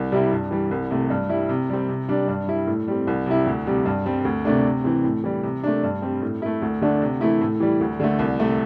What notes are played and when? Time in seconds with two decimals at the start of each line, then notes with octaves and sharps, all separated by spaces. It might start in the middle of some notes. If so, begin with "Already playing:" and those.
Already playing: C2
0.12 C3 G3 C4 E4
0.32 G2
0.51 E3 G3
0.71 C2
0.90 C3 A3
1.10 G2
1.29 G3 E4
1.49 C3
1.70 G3 C4
1.89 C3
2.09 G3 D4
2.28 G2
2.48 G3 E4
2.67 A2
2.88 G3 C4
3.07 C2
3.26 C3 G3 E4
3.47 D2
3.67 C3 G3
3.85 G2
4.06 G3 C4
4.25 D2
4.45 C3 A3 D4
4.65 C3
4.84 E3 C4
5.04 A2
5.24 E3 G3
5.43 C3
5.63 A3 D4
5.83 G2
6.02 G3 C4
6.22 A2
6.42 A3 E4
6.62 D2
6.81 D3 A3 D4
7.02 C3
7.21 E3 A3 E4
7.41 A2
7.60 E3 G3
7.81 D2
8.00 D3 A3
8.19 C2
8.39 C3 A3